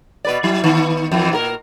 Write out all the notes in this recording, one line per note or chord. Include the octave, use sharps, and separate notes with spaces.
B2 B4 D5
F#3 E4
D#3 B3
F2 E3
A#2 F4 A#4